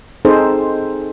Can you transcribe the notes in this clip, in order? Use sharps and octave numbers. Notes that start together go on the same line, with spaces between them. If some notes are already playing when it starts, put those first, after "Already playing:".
C4 D#4 G#4 A4 C5